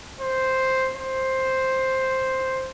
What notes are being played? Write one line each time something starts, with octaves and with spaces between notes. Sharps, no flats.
C5
C5